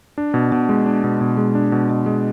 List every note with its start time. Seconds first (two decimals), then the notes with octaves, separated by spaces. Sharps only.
0.18 D4
0.34 B2
0.52 B2
0.69 G#3
0.86 D4
1.04 B2
1.21 B2
1.37 G#3
1.55 D4
1.72 B2
1.90 B2
2.06 G#3